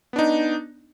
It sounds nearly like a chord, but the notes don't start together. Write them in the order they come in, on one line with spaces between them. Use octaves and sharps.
B3 D4 D#4